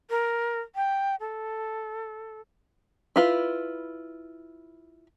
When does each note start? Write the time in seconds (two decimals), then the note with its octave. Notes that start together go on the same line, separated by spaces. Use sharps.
0.10 A#4
0.75 G5
1.20 A4
3.16 E4 F4 B4